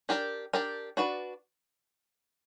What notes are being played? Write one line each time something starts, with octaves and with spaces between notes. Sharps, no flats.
D4 G4 A#4 D5
D4 G4 A#4 D5
D4 F#4 B4 D5